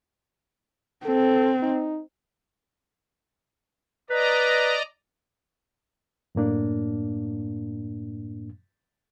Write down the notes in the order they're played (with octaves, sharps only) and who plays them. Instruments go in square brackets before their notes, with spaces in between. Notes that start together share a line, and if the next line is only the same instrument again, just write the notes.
[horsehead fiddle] C4 [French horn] A4
[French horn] D#4
[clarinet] B4 [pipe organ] D5 D#5 A#5
[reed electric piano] F#2 A2 A#3 D4